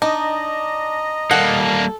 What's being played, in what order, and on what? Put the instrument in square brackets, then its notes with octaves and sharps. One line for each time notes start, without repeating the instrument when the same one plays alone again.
[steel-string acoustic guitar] D4 [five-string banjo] D#4 [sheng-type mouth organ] D#5 A#5
[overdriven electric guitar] G3 A#3 [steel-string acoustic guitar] A4 [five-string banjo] F#5